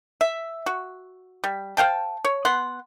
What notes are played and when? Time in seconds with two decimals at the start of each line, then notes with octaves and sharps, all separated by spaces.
0.21 E5
0.66 F#4
1.44 G3
1.77 C5 F5 G5 A5
2.25 C#5
2.45 B3 F#5 C6